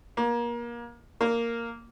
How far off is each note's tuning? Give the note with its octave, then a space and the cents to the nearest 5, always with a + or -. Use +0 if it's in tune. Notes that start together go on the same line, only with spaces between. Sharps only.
A#3 +30
A#3 -5